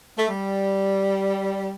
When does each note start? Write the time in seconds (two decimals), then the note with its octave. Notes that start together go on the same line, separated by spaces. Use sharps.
0.18 A3
0.29 G3